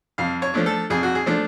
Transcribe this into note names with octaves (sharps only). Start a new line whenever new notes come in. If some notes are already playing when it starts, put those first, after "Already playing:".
F2 F5
C#5
F3 A3 D4
A4
F2 G#4
F#4
G#4
F3 A3 D4